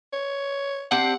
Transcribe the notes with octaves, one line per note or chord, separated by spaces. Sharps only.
C#5
C4 D4 G4 F#5